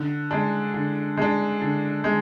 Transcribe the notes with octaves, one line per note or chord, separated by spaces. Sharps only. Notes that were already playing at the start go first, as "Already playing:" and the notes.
Already playing: D3
G#3 D4
D3
G#3 D4
D3
G#3